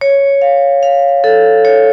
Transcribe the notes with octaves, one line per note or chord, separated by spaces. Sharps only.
C#5
F5
F5
A4
C#5